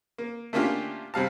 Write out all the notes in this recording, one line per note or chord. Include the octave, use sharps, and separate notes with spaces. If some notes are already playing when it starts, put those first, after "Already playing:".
A#3
A3 A#3 C#4 D4 F4 G4
C3 G3 F5 A5